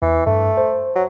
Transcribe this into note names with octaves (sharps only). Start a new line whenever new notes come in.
E2 E3
G2 A3
C5
F#3